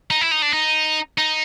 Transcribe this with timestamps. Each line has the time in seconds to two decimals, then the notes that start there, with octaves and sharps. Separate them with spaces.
0.10 D#4
0.21 E4
0.31 D#4
0.42 D4
0.53 D#4
1.18 D#4